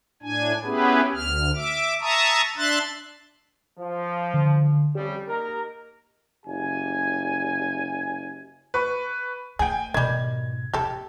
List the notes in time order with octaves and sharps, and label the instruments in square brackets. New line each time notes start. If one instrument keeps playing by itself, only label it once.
[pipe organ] A2 D4 G#5
B3 C#4 E4 G4 G#4 B4
D2 F6
E5 D6
E5 A5 A#5 C#6 D#6
D4 E5 C6 F#6 A6
[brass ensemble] F3
[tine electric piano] D3
[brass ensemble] F2 C#3 G3 [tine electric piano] G4
[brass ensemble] A#3 D#4 A#4
F#1 G4 G#5
[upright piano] B4 C#6
[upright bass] A3 [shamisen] G#4 [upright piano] G5 G#5
[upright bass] G#2 B2 [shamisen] D#3 G3 [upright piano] G#6
[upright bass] E1 [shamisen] G4 A4